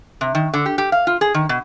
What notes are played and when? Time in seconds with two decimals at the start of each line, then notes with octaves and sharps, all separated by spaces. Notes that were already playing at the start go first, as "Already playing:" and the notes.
0.21 C3
0.35 D#3
0.54 D3
0.66 G4
0.78 G4
0.92 F5
1.07 F4
1.21 G#4
1.34 D#3
1.49 B2